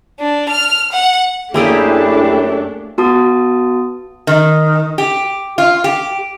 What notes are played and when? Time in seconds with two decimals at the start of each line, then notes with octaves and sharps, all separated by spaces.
0.19 D4
0.49 F6
0.92 F#5
1.54 F#2 A3 A#3 D4 E4 G4 G#4 D5
2.98 B3 F#4 A5 D#6
4.27 D#3
4.98 G4
5.58 F4
5.84 G4